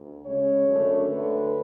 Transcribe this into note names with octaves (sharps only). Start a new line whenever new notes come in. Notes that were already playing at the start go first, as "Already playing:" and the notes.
Already playing: D2
C#3 G#3 C#4 C#5
F#2 D3 A3 D4
D2 D3 A3 B4